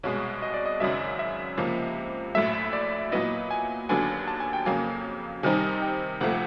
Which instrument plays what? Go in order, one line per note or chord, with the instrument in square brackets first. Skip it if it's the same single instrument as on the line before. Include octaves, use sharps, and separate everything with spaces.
[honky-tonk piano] C2 B2 G#3 [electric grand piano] C#5
[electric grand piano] D#5
D5
D#5
[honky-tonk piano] G#1 F#2 C#3 F#3 [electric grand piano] E5
[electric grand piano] E5
[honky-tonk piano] C#2 C3 F3 A#3
[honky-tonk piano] A#1 A2 F#3 A3 [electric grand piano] E5
[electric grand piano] D5
[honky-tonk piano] A#2 F#3 B3 E4 [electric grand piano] D#5
[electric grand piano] G#5
[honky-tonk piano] D#2 D3 F#3 B3 D4 [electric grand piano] G#5
[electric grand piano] A5
G#5
G5
[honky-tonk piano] F2 C#3 F#3 A#3 [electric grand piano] G#5
[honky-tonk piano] C3 D#3 G3 C4 D#4 [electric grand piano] G#5
[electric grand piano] G5
[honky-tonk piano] D2 C3 F3 A3 [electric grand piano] F#5